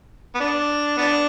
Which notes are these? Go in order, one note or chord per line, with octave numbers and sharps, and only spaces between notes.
B3
D4
B3 D4